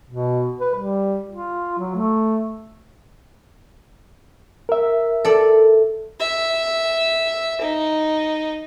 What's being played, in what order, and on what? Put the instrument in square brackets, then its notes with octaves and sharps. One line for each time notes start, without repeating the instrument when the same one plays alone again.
[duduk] B2
B4
G3
F4
F#3
A3
[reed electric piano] A#4 E5
[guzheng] A4 D5
[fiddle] E5
D#4